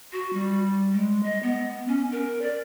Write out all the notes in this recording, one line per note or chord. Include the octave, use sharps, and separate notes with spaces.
F#4
G3
G#3
D#5
B3
C#4
A#4
D5